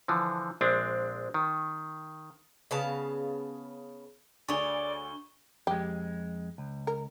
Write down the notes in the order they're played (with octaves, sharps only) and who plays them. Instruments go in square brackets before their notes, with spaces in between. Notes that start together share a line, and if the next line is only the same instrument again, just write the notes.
[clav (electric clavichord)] D3 E3 F3
A#1 G#3 C4 D4
D#3
[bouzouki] C#3 B3 F5 A5
[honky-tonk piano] D2 [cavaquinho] G#4 C#5 [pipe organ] D5 [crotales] C#6 G7
[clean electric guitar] F2 G#3 [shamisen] G4
[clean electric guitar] C#2
[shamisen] A#4